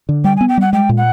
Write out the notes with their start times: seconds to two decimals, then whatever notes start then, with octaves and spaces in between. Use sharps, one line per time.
0.09 D3
0.24 G3 G5
0.37 G#5
0.41 B3
0.49 G5
0.58 G3 F#5
0.73 G#3 G5
0.89 A#2
0.97 F#5